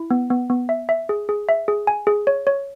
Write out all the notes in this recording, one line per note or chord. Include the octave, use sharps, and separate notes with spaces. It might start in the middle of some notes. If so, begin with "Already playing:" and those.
Already playing: E4
B3
B3
B3
E5
E5
G#4
G#4
E5
G#4
G#5
G#4
C#5
C#5